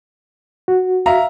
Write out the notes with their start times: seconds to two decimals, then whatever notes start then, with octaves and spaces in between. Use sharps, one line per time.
0.68 F#4
1.06 E5 F5 A#5